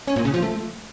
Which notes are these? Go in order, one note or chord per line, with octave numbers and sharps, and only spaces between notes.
C#4
A#2
C#3
F3
A3